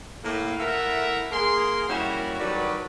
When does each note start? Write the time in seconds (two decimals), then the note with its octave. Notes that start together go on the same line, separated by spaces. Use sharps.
0.24 A2 A#3
0.59 A3 E4 A4 A#4 E5 F#5
1.32 A#3 G#4 A#4 C6
1.88 G3 A#3 C#4 E4 F#4
2.40 D#3 F#3 G3 A4 B4 D5